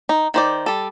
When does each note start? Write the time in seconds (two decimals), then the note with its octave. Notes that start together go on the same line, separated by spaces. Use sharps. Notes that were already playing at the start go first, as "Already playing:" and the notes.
0.09 D#4
0.34 D#3 C5 D5
0.66 G3 A4